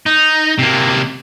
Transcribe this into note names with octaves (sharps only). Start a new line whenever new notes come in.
D#4
C3 A#3